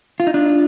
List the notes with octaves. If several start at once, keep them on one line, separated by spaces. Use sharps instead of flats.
F4
D#4
D4 F4